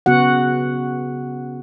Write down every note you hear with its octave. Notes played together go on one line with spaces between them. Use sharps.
C#3 B3 F#4 F#5